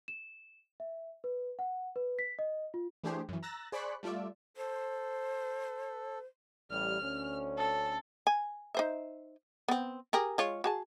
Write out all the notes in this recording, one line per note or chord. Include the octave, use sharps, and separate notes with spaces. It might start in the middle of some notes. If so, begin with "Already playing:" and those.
E7
E5
B4
F#5
B4
B6
D#5
F4
E3 A3 D4 G4 G#4 C5
F#2 E3
A#5 E6 F#6 A6 A#6
G#4 C5 D5 B5 C#6 F#6
G3 A3 F4 D5 E5
A4 C5
A1 G3 F6
D2 C#4
A4
G#5
D#4 C5 E5
B3 C4
G4 G#4 A#4
G#3 F4 C#5
F#4 G#4 A5